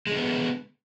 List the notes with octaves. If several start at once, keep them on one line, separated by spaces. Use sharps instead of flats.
D3 G#3 B3